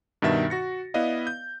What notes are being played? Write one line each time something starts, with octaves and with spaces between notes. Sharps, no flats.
G2 B2 D#3 E5 A6
F#4 A#6 C#7
B3 E4 B4 D5 D#5 F5
G6